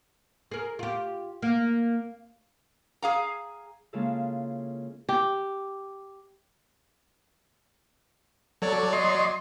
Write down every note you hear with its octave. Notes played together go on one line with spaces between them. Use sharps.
G#4 A#4
F4 G4
A#3
G#4 F5 A#5
C#3 G#3 A#3 E4 F4 A4
G4
F#3 A4 C#5 D5
D#5 C6